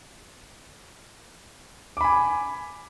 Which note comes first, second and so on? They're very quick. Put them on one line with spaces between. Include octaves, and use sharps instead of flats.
D6 B5 G#5